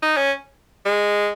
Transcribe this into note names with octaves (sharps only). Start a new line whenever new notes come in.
D#4
C#4
G#3